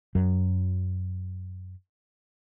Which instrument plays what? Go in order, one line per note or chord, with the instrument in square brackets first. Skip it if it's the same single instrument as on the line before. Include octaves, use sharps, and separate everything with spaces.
[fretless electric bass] F#2 F#3